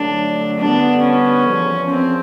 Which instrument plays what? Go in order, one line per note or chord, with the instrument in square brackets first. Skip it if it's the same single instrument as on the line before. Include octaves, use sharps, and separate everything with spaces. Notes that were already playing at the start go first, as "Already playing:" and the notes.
Already playing: [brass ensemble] G2 D3 F#3 A3 [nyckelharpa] D4
[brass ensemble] D3 G3 B3 [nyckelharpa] D4
[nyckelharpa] C#4
[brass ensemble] E2 C#3 F3
[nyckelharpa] C4